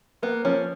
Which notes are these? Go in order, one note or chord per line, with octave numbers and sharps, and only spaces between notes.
A#3 B3
F3 C#4